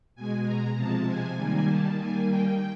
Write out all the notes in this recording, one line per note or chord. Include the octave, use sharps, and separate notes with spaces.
B2 G#3 G#5
A#5
C3 F3 G#3 A5
G#5
D#3 G3 A#3 G#5
A5
D#3 G3 A#3 G#5
G5